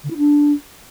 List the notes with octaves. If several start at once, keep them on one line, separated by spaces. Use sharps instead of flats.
D3
E4
D4